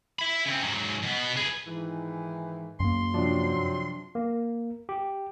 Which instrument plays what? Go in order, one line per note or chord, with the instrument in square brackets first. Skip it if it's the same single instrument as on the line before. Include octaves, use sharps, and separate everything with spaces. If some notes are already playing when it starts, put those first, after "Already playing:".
[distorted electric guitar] E5 B5
C#3 C4
G#2 F#3
B2 B3
G#4 B4
[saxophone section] G#2 D#3 E3
[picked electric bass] F#2 A#3 [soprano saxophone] C6
[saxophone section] C3 F#3 [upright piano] F3 D4
[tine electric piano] A#3
G4